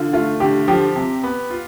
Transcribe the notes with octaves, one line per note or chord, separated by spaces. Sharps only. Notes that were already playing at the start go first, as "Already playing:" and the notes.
Already playing: D3 F4
A3 F4
D3 G4
F3 G4
C3
B3
F4